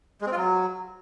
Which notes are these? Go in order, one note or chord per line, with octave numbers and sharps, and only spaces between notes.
G#3
C4
F4
F#3